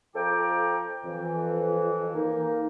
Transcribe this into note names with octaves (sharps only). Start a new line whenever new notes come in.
F2 F3 A4 G5 A#5 D6
F2 E3
A#3 D#4